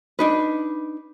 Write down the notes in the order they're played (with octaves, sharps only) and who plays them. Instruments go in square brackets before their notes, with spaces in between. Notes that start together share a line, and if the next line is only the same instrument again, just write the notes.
[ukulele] D4 D#4 B4